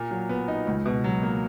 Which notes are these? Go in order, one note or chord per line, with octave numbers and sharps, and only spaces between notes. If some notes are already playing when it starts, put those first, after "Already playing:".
Already playing: A#2 A#3
F#3
B3
D#4
C#2
B2
F#3
A#3